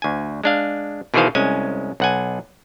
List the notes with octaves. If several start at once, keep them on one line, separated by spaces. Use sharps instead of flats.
D2 G#5
G#3 D4 F5
B2 D#3 E3 G#4 C5 F5
C2 G#3 C#4 G#5
B1 F#5 G#5